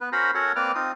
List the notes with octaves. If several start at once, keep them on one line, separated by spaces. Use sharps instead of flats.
B3 B4
C#4 F#4 A#4 C5 A#5 B5
C#4 F#4 A4 A#4 C#5 F#5
A#3 C4 B4 D5 D6 F6
C4 D#4 F4 D#6